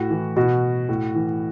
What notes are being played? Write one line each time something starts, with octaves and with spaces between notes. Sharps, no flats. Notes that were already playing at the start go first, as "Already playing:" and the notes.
Already playing: A2 F#4
E3
B2 F#4
A2
E3